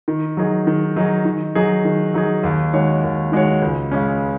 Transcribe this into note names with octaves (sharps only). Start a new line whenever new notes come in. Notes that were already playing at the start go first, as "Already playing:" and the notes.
D#3
F#3 D#4 G#4
D#3
F#3 D#4 G#4
D#3
F#3 D#4 G#4
D#3
F#3 D#4 G#4
D#2
D#3 G#3 F#4 C#5
D#2
D#3 G#3 F#4 C#5
C#2
C#3 G#3 C#4